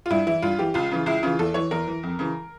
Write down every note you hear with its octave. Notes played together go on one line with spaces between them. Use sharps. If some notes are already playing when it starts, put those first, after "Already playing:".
F4
G2 E4
E3 E4
G2 F4
E3 G4
C#2 F4
C#3 E3
C#2 E4
C#3 E3 F4
E2 A4
E3 C#5
E2 A#4
E3
F2
C#3 E3